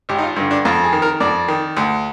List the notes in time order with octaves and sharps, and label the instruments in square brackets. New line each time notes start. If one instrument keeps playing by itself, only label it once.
[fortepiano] G#1 G4
D#4
F4
G2 D3
D4
F2 F4
G#4
D#3
A#4
F2 D5
D#3
D2